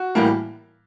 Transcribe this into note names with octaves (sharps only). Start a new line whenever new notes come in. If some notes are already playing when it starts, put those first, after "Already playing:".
Already playing: F#4
A2 E3 G3 A#3